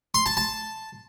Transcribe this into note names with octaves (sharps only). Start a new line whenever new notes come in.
C6
A5
A5